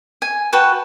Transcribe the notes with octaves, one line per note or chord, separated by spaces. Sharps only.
G#5
F#4 B4 G5 A5